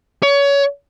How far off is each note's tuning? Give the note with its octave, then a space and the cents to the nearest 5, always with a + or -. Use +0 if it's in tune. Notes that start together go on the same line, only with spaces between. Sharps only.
C#5 +25